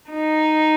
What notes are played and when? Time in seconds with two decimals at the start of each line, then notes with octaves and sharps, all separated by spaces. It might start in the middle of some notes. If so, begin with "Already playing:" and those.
0.10 D#4